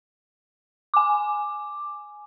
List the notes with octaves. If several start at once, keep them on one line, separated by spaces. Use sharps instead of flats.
G#5 D6